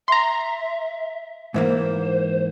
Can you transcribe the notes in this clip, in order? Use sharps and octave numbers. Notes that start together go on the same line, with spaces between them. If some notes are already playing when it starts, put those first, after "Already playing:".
E5 A#5 C6
G#2 E3 A#3 C5